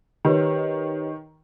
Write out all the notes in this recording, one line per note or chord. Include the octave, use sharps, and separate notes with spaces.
D#3 G4 B4 C#5